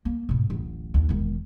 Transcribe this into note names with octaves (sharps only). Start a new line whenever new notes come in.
A#3
G#2 B2
D1 A1
D#2 D4
E1 D#3